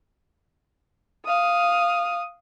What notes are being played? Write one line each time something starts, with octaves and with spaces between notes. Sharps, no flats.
F5 D#6